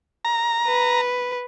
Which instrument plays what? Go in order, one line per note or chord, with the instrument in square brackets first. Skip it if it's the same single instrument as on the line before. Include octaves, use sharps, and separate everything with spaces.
[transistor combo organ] A#5
[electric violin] B4